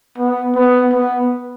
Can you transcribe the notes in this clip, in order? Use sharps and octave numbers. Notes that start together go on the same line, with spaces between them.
B3
B3
B3